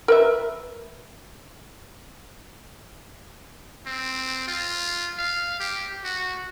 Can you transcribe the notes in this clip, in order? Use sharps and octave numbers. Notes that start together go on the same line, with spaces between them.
A#4 B4 E5
C4
F4
F5
G4
F#4